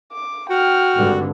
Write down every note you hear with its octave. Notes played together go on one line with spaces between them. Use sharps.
D6
F#4 G5 F6
G#1 G2 D3